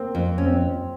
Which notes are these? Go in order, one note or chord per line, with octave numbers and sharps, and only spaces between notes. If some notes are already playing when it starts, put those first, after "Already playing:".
Already playing: A#3 C4
F2
C#4
C4